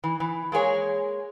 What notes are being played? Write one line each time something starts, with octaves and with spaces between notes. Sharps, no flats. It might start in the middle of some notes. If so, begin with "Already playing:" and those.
E3
E3
G#3 A#3 G#4 C#5